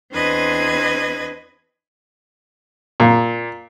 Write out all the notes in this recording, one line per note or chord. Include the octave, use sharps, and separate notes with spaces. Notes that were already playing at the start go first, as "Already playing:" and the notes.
E2 C4 D4 B4 D#5 G#6
A#2